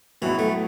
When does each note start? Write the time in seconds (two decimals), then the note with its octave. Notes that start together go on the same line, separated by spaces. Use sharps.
0.22 A2 E3 F#3 B3
0.39 A3